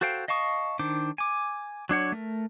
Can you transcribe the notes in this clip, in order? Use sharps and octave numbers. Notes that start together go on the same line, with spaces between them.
F#4 A4 C5 F5 G5
D#5 F5 A5 C#6 D#6
D#3 D4 C5 D6
G#5 D6
F#3 D4 C#5 F#5
A3 A#4